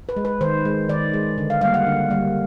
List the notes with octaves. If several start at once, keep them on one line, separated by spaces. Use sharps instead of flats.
B4
G#3
B4
D#3 C5
G#3
D#3 D5
G#3
D3
F5
G3 A#3 F5
F#5
D3
G3 A#3